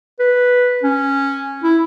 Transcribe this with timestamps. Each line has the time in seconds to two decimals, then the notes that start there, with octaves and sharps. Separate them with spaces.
0.20 B4
0.83 C#4
1.63 E4